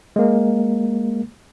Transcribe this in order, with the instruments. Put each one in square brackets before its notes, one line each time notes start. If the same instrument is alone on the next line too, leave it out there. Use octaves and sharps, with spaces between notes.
[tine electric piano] G#3 A#3